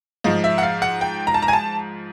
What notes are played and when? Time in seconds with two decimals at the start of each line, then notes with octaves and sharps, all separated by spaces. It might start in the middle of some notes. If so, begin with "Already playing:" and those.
0.24 G#2 F3 D#5
0.44 E5
0.58 F#5
0.63 F5
0.82 F#5
1.01 G5
1.27 A#5
1.34 A5
1.42 A#5
1.48 G#5
1.53 A5